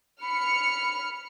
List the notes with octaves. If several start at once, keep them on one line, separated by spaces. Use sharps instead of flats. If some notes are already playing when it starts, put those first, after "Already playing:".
B5 F6 C#7